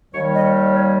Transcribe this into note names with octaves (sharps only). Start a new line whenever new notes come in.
D#2 D#3 G3 C#5
D#5
D#5
C#5